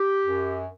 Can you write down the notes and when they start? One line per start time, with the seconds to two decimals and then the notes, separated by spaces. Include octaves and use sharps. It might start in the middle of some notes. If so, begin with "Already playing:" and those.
Already playing: G4
0.24 F#2